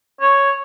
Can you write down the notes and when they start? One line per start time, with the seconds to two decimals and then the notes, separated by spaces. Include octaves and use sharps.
0.21 C#5